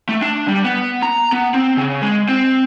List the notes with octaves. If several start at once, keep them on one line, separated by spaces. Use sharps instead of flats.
A3
D4
G3
B3
A#5
B3
C4
C#3
G#3
C4